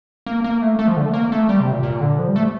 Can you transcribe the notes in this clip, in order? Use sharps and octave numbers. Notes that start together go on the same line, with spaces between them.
A#3
A#3
A3
A3
F3
D3
A3
A#3
A3
G3
C3
A#2
A#2
D3
F3
G3
A3